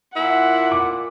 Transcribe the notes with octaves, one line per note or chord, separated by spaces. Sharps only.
A#2 E4 F#5
D6